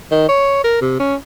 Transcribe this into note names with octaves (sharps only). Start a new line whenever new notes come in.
D#3
C#5
A#4
C3
C#4